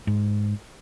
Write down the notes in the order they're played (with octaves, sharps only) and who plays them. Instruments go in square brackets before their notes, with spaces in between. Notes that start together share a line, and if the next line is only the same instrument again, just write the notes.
[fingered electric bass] G#2